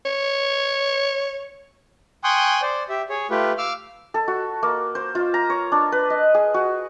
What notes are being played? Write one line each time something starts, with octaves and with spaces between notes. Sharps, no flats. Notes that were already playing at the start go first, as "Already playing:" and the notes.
C#5
G5 G#5 C6 C#6 D#6 F#6
C5 D5
G4 E5
G#4 C#5
A3 F4 G4 B4
F5 D6 E6 F6
A4
F#4
A#3
C5
F4
A#5
C#5
D4
B4
D#5
G#4
F#4